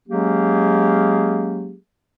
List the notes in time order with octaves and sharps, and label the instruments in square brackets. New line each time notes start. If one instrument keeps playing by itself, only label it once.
[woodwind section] F#3 G#3 A#3 C#4 G4 G#4